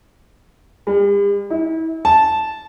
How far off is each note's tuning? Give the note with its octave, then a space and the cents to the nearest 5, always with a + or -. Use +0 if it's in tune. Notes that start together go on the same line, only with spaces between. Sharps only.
G3 +45
E4 -35
A5 -10